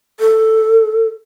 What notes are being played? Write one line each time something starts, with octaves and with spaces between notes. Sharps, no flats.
A4